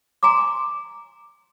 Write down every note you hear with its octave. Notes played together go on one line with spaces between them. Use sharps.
G#5 A#5 C6 D6